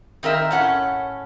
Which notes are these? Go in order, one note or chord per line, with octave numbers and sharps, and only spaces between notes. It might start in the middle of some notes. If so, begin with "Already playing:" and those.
D#3 C4 A#4 E5
A2 C#4 F#5